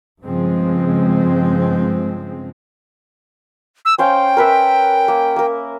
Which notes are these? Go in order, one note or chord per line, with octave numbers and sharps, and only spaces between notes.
G2 C#3 F3 G#3 C4
E6
C#4 C5 F5 G5
A#4 B4 E5
A#3
A#3 A#4